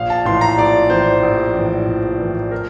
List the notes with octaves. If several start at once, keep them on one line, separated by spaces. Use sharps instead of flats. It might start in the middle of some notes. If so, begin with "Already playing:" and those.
Already playing: A#1 F5
A5
A2 E3 C6
A#5
A#1 D5
A2 E3 C5
A#1
A2 E3
A#1
A2 E3
A#4